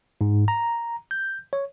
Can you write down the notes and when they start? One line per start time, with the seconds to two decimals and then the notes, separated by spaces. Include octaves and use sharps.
0.21 G#2
0.48 A#5
1.11 G6
1.53 C#5